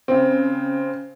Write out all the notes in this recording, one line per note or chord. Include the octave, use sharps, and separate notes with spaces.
C#3 C4